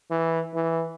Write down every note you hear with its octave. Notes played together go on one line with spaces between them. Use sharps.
E3
E3